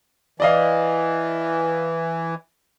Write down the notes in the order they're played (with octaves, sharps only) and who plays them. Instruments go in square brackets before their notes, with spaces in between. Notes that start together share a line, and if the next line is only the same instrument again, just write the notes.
[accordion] E3 [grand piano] D5 D#5 F5